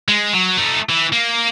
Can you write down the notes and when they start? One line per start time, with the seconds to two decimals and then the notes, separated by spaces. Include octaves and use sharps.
0.08 G#3
0.33 F#3
0.57 A3 D#4
0.89 E3
1.12 A#3